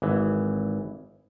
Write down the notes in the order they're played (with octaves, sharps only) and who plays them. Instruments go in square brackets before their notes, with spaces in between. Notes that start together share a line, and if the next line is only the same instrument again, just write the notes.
[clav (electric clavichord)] G#1 E3